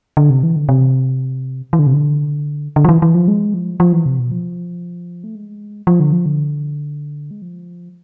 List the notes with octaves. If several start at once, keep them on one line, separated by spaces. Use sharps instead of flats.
D3
C3
E3
D3
C3
E3
D3
C3
D3
D3
F3
E3
E3
F3
G#3
F3
F3
E3
C3
B2
F3
A3
G#3
F3
D3
F3
D3
G#3
F3